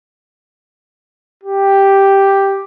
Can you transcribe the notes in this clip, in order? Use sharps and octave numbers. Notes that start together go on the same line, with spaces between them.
G4